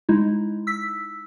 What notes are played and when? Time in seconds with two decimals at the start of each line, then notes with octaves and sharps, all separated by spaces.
0.09 G#3 D#4 E4
0.67 E6 B6